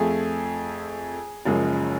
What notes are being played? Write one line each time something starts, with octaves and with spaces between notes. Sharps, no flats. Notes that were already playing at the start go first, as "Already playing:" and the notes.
Already playing: F2 F3 A3 G#4
F#1 F#2 F3 G#3